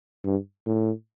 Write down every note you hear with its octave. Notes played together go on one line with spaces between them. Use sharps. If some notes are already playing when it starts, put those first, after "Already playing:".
G2
A2